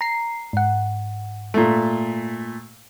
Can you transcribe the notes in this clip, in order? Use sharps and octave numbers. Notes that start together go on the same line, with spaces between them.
A#5 C7
G#2 F#5
A#2 A3